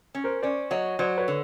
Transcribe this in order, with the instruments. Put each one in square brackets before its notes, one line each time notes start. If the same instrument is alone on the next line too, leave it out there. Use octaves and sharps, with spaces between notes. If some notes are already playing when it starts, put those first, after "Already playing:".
[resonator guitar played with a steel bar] C#4
[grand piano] A#4 C5
[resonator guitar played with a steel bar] C#4 [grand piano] C5 D5
[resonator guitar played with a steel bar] F#3 [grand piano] C#5 D#5
[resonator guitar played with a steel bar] F#3 [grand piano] C5 D5
[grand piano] B4 C#5
[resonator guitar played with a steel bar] D3